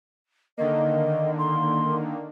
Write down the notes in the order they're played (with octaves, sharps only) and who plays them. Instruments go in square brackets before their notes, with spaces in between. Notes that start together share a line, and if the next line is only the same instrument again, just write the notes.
[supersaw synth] D3 D#3 A#3 [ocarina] D#5
[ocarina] C6